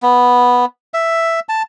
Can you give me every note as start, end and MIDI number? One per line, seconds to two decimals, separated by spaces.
0.03 0.65 59
0.94 1.40 76
1.49 1.62 81